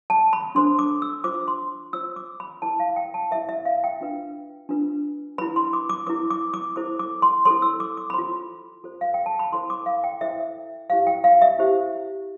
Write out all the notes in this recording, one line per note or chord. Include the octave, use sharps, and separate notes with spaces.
A5
B5
D4 A4 C5 C6
D6
E6
F4 C5 D6
C6
F4 C5 E6
D6
B5
E4 B4 A5
F5
G5
A5
E4 B4 E5
E5
F5
G5
D4 F4 B4
D4 F4 B4
E4 B4 B5
C6
D6
D6
E4 B4 D6
D6
D6
E4 A4 C5 D6
D6
C6
E4 A4 C5 C6
E6
D6
D6
B5
F4 A4 C5 C6
F4 A4 C5
F5
G5
A5
B5
E4 A4 C5 C6
D6
F5
G5
E4 A4 C5 E5
E4 G4 C5 F5
G5
F5
E5
E4 G4 C5